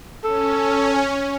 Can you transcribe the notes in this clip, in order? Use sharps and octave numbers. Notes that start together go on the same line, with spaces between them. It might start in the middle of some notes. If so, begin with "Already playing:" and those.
C#4 A4